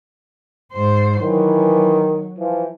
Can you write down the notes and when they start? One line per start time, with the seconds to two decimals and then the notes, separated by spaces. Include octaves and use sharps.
0.73 G#2 C5
1.22 D#3 E3 F#3
2.39 E3 F3